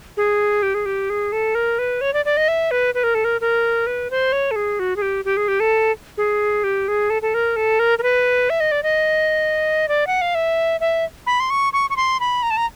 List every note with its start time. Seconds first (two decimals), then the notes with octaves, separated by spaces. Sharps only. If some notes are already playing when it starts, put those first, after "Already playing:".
0.17 G#4
0.63 G4
0.75 G#4
0.86 G4
1.10 G#4
1.32 A4
1.55 A#4
1.79 B4
2.01 C#5
2.14 D5
2.25 D5
2.37 D#5
2.48 E5
2.71 B4
2.95 B4
3.04 A#4
3.15 A4
3.25 A#4
3.41 A#4
3.87 B4
4.11 C5
4.32 C#5
4.51 A4
4.56 G#4
4.79 F#4
4.96 G#4
5.02 G4
5.25 G4
5.37 G#4
5.48 G4
5.60 A4
6.18 G#4
6.64 G4
6.88 G#4
7.10 A4
7.22 A4
7.34 A#4
7.56 A4
7.79 A#4
7.99 A#4
8.03 B4
8.50 E5
8.60 D#5
8.72 D5
8.83 D#5
9.88 D5
10.07 F#5
10.21 F5
10.35 E5
10.80 E5
11.27 B5
11.40 C6
11.50 C#6
11.73 C#6
11.90 C#6
11.97 C6
12.20 B5
12.43 A#5
12.51 A5
12.57 A#5